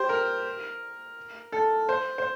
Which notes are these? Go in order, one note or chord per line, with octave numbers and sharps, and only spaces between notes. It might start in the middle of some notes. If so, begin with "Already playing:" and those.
Already playing: G4 C5
A#4
A4
C5
C5